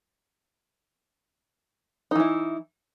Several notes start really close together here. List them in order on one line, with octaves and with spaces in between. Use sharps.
D#4 E3 E4